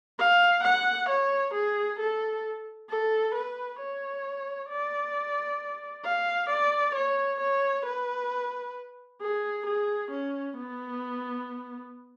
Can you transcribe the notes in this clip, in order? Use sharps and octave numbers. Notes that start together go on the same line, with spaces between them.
F5
F#5
C#5
G#4
A4
A4
B4
C#5
D5
F5
D5
C#5
C#5
B4
G#4
G#4
C#4
B3